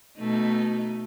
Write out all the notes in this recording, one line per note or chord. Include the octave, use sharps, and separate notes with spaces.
B2 A3 D#4